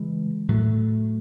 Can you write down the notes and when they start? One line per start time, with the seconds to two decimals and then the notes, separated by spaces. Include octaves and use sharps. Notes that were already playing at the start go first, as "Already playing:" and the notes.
Already playing: C#3 E3 G#3
0.48 A2 F#3 A3